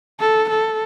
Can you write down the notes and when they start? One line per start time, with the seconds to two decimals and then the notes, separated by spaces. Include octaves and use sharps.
0.20 A4
0.49 A4